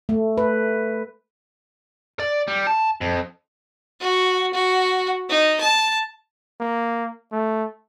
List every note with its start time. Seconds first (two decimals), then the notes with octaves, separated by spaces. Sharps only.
0.09 A3
0.38 B4
2.20 D5
2.48 G3
2.67 A5
3.01 F2
4.01 F#4
4.54 F#4
5.30 D#4
5.61 A5
6.60 A#3
7.32 A3